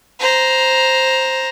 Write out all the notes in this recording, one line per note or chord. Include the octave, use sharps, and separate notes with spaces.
C5 A#5